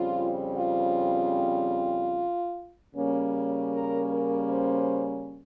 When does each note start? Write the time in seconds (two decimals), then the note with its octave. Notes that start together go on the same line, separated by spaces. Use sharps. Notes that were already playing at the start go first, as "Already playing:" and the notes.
Already playing: F2 C#3 G3 C4 F4
0.57 F4
2.93 C#3 G3 A#3 C#4
3.72 A#4
4.11 A#4
4.50 C5